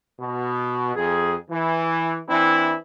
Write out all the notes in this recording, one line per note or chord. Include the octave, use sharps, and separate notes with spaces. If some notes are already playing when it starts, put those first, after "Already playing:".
B2
F2 G#4
E3
E3 C4 D4 E4